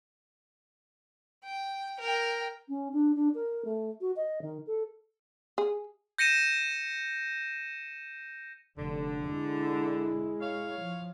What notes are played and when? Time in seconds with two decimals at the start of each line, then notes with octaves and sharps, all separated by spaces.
1.44 G5
2.00 A#4 G5
2.68 C#4
2.93 D4
3.15 D4
3.34 A#4
3.64 A3
4.01 F#4
4.16 D#5
4.41 D#3
4.66 A4
5.58 G#4
6.18 G6 A#6 C#7 D#7 E7
8.78 F1 D3
9.30 G#3 E4
10.41 C#5 F5
10.80 F3